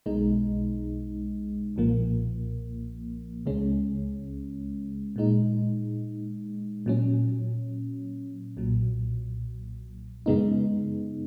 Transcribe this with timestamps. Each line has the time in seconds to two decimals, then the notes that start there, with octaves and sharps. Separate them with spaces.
0.06 B1 B2 G#3 D#4
1.76 B1 A#2 F3 A#3
3.46 C#2 C#3 G#3 C#4
5.16 A#2 G#3 D#4
6.86 A#2 F#3 C#4
8.57 B1 A#2 F#3
10.26 F#2 C#3 G#3 B3 D#4